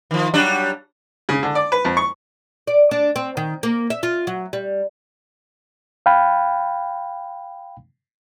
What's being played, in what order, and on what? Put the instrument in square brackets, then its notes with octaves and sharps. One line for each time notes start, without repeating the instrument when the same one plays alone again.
[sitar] D#3 F3
F#3 G3 D4
[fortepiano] C#3
D3
D5
B4
F2
C#6
[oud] D5
D4
C4
D#3
A#3
E5
F4
F#3
G3
[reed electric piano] F5 G5 B5